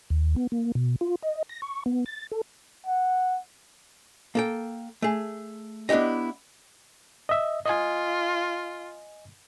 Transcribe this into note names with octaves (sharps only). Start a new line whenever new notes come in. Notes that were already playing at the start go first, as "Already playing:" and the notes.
D#2
B3
A#3
B2
F4
D#5
A#6
C#6
B3
A6
A4
F#5
A#3 A4 G5
A3 G#4
B3 D4 E4 G4 D#5
D#5 E5
F4 D#5 G#5